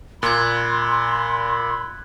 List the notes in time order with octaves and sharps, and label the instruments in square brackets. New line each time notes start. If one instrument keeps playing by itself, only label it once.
[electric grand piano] A#2 [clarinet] B5 [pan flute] C6 [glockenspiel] F#6 G#6